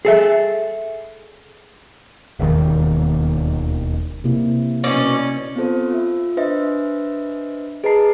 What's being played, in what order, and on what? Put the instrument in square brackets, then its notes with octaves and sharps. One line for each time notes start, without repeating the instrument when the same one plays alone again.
[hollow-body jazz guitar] G#4 A4 E5
[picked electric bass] E1 D#2 D#3
[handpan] C3 A#3 E4
[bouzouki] B2 D5 [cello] C#4
[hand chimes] B3 C4 F4 A4 C5
F4 E5
D4 B4 C5 D#5 E5
G#4 B4 D#5 A5 A#5 C7